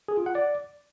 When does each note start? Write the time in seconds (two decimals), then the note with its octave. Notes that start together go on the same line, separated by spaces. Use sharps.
0.08 G#4
0.17 F4
0.26 F#5
0.35 D5